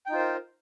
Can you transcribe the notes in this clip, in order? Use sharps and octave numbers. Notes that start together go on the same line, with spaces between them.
D#4 F4 A#4 C5 G5